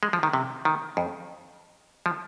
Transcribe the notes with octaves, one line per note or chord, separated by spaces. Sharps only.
G#3
F3
D#3
C3
D#3
F2
F3